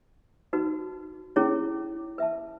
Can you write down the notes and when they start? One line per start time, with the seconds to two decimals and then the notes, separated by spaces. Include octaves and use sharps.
0.53 D#4 F#4 B4
1.36 C#4 E4 G#4 C#5
2.18 B4 E5 A5